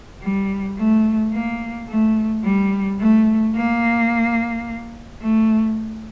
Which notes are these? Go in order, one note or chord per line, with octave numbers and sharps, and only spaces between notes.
G3
A3
A#3
A3
G3
A3
A#3
A3